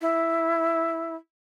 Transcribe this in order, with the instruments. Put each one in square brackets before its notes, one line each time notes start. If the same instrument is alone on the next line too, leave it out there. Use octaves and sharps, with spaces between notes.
[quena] E4